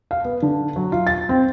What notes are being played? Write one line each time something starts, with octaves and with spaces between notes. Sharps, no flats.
F5
B3
D3
F#3
F4
A6
C4